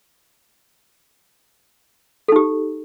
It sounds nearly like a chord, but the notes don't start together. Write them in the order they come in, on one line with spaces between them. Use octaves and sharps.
A4 D#4 G4